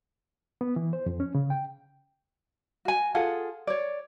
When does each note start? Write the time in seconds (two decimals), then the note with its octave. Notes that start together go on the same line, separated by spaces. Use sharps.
0.61 B3
0.76 E3
0.93 C5
1.06 F2
1.20 C#4
1.35 C#3
1.50 G5
2.85 F#4 G#5
3.15 F4 G#4 A4 F#5
3.67 C#5 D5